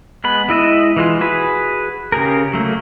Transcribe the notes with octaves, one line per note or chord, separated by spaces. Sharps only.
G#3 B3 B5
G#3 E4 D#5 E5
E3 G#3 F4
F#4 G#4 B4
C#3 G4 G#4 A#4
F#3 A3 A#3